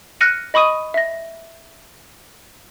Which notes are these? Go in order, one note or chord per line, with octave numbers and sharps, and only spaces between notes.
F6 F#6 A#6 C#7 D#7
D#5 B5 C#6 D#6 D#7
E5 A#6